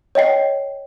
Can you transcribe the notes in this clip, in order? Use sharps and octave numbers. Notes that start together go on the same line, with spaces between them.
C#5 D#5 G5 C7